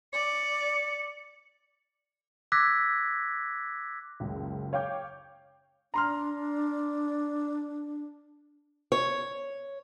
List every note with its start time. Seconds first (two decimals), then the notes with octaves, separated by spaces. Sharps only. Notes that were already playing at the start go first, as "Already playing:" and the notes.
0.13 D5 C#7
2.52 D6 E6 F#6 G#6 A#6 B6
4.20 F#1 C#2
4.73 C#5 F5 G5 D6 G6
5.94 D4 A#5 C6 F6
8.92 C#5